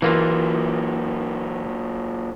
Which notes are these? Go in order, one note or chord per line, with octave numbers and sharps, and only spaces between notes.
A#2 E3 F#3 A#3 F4